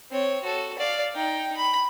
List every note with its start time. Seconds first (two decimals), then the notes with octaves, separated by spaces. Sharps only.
0.11 C4 C#5
0.43 F#4 A4
0.78 D5 F5
1.15 D#4 G5
1.57 B5